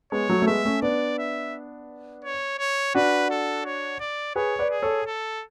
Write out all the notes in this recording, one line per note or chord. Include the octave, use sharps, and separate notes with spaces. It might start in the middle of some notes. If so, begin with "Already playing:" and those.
G#3 B3 C#5
F#3 A3
A3
G#3 B3 E5
A3 C#4
B3 D4 D5
E5
C#5
C#5
D4 F#4 B4
A4
C#5
D5
G#4 B4 C#5
B4 D5
G#4
A4 C#5
A4